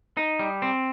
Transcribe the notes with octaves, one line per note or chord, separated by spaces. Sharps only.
D#4
G3
C4